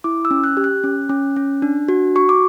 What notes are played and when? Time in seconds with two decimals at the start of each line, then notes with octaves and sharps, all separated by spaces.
0.04 E4 D6
0.25 E6
0.31 C#4
0.44 F#6
0.57 G4
0.64 F#6
0.84 C#4
1.09 C#4
1.36 C#4
1.62 D4
1.88 F#4
2.16 F#4 C#6
2.29 D6